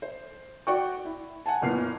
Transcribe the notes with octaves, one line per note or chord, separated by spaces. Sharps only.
C5
F#4 D5 F#5 G5 C#6
E4
F#5 G#5 A5
F#1 A#2 B3 F6 C7